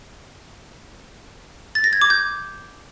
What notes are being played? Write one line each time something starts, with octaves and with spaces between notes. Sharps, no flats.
A6
A#6
G#6
D6
G6